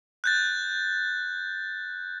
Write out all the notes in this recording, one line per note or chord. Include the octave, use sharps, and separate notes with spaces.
F#6 G6 A6